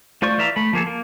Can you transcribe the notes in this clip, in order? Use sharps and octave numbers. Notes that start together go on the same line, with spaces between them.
A3 F4 C5 D5 C#6
E3 D5 E5 F5 A#5
A3 B5
F3 A#3 G#4 A4
A#3